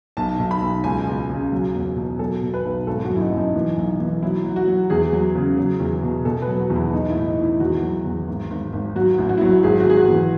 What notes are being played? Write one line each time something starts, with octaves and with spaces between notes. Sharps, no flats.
B1 A5
B1
B5
B1
C#2 G#5
C#2
C#3
F#3
E1
B2
F#3 A4
B2
B4
B1
G#1 A4
F#4
F#2
E4
D#4
F#2
D#4
E3
B1
E3
F#3 E4
F#3
F#4
F#3
E2 G#4
F#3
C#3
F#3
E2
B2
B2 A4
B4
F#3
F#4
E2
E4
B1 D#4
E4
A2
D#4
A2
E4
E2 F#4
F#3
E2
G#1
G#1
G#1
F#3 F#4
A1
F#4
E4
F#3 F#4
G#1 G#4
F#4
G#1 G#4
F#4
E3